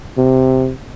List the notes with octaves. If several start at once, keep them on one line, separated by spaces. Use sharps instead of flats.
C3